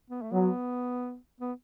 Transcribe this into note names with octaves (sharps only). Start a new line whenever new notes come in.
B3
A3
F#3 B3
B3